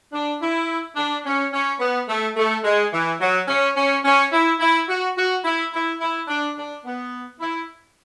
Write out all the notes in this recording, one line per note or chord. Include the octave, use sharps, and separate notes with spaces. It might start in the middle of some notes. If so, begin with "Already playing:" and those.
D4
E4
D4
C#4
C#4
B3
A3
A3
G#3
E3
F#3
C#4
C#4
C#4
E4
E4
F#4
F#4
E4
E4
E4
D4
D4
B3
E4